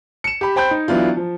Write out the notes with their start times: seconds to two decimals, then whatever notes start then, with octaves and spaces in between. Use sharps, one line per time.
0.24 C#7 E7
0.41 G4 B5
0.56 C5 G5 B5 G6
0.71 D#4
0.88 E3 F#3 B3 D4 E4 F4
1.17 F3